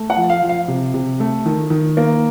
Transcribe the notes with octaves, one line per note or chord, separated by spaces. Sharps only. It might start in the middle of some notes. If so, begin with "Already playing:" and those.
Already playing: A3
F#5
F3
F5
F3
F5
C3
C3
A3
D#3
D#3
A#3